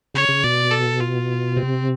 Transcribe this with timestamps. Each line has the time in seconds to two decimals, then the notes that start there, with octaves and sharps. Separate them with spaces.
0.14 C#3 C#5
0.29 C#3
0.43 B2 D5
0.71 A4
1.00 F4
1.56 C3 C4